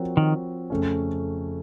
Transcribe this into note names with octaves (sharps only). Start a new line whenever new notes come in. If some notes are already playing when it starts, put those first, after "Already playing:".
Already playing: F3 C4 F#4 A#4 C#5
D#3
F2 C#3 A3 C#4